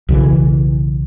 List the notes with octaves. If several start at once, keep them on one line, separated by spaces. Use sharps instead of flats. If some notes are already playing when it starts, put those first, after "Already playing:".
B1 C#3 E3